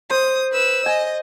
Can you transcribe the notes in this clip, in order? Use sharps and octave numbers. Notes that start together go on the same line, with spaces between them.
C5 D#6
B4 E6
D#5 G#5